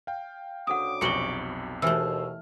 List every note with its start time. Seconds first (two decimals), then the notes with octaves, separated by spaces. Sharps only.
0.07 F5 G5
0.67 D2 C#3 F#5 D6 D#6
1.01 B1 F2 C3 B3 F#4 C#7 F#7 G7
1.82 D#2 B2 E3 A3 C5 E6 F6